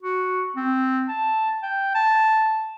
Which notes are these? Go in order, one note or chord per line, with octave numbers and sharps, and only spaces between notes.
F#4
C4
A5
G5
A5